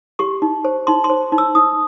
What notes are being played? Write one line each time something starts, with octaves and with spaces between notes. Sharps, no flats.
G4 C#6
D#4
C5
D#4 C6
C6
C5
D#4
E6
D#4 D#6